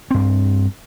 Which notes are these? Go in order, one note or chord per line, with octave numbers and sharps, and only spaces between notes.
G2 C4